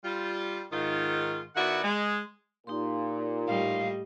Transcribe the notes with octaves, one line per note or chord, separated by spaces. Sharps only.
G3 F4
G#2 D#3 F4
D#3 B3 E4 F#4 D5 F#5
G#3
A#2 D#4 G4 C6
A2 G3 D#5 F5